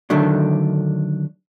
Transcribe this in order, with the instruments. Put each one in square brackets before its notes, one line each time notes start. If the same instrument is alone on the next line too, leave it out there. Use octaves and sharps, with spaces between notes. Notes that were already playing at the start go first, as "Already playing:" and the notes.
[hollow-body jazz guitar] D3 D#3 F#3 A3 D4